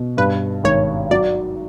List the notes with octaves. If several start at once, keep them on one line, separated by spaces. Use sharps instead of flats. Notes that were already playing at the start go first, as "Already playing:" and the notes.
Already playing: B2
G2 B4
G#1 C#5
F#3 D5